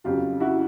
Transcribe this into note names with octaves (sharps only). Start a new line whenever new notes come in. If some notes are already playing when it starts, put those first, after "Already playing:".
F2 C#3 F#3 F4 G4
E4 F#4